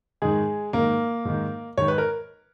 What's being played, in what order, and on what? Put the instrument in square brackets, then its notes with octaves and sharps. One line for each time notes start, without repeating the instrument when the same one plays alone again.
[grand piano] G#2 D#3 G#3 G#4
G#2 D#3 A#3 A#4
G#2 D#3
G#2 D#3 C#5
B4
A#4